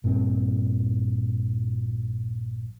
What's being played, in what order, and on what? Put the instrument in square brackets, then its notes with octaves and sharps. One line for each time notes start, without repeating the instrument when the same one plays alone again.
[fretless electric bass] A#1 G2 A#2 C4